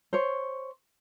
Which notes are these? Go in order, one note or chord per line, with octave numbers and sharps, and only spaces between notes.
C5 C#5